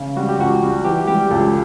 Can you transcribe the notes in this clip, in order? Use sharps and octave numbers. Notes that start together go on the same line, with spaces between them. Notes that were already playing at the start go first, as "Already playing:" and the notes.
Already playing: C#3
G3 F#4
G4
C#2 F#4
G3
E3 G4
G3 G4
C#2 A4